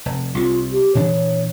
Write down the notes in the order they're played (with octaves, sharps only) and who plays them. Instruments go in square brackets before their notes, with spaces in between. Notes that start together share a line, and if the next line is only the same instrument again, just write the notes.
[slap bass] F1
[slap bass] C2 C3 [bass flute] F4
[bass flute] G4
[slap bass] A#2 E3 D4 [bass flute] C#5